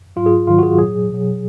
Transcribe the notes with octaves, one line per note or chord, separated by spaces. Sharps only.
G#2 F#3 F4
G#4
G#2 D#3 F#3 F4
F#4
G#4
A#2 F#3 G#4
B2 F#3